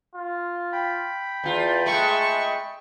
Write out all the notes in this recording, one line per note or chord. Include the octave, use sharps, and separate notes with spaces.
F4
G5 B5
E2 F4 A5
G#3 A3 C#6